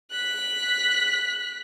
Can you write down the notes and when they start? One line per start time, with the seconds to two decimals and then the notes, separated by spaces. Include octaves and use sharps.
0.12 F#6 B6